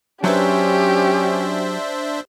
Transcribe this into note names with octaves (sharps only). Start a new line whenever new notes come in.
F#3 C#4 D4 G4 B4 C5 E5